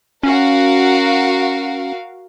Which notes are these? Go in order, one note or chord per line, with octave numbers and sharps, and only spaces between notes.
C#4 F#4 A#4 F5